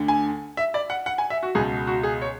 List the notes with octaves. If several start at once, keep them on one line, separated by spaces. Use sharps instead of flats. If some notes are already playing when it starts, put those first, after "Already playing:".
Already playing: D2 D3
G#5
E5
D5
F#5
F#5
G#5
E5
F#4
C#2 B2 G#4
F#4
G#4
C#5